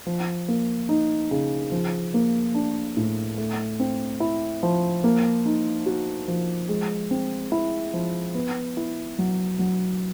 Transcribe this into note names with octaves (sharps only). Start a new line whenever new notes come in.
F3
A#3
D#4
C#3
F3
A#3
D4
A2
A3
C4
E4
F3
A#3
D#4
F#4
F3
G#3
C4
E4
F3
B3
E4
F#3
F#3